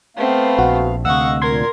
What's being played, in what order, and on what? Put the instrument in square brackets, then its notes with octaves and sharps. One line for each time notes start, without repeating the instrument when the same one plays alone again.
[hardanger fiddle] A3 C4 [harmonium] B3 F5
[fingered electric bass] A#1 [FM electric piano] F#4
[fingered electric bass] D2 C3 [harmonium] D#5 F5 [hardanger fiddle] F#5 C#6 [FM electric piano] E6
[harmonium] A#2 [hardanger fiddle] A#4 [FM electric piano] C6 G#6